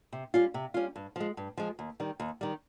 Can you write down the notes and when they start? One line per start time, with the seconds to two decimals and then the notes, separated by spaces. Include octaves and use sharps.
0.13 C3
0.34 G3 C#4 F4
0.54 C3
0.74 G3 C#4 F4
0.96 G2
1.16 F3 G#3
1.37 G2
1.57 F3 G#3
1.79 D#2
2.00 D#3 G3
2.20 D#2
2.41 D#3 G3